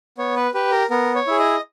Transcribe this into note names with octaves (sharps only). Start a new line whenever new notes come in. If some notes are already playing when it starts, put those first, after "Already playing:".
B3 C#5
B4
G4 B4
A#4
B3 A#4
C#5
E4 G#4
D#5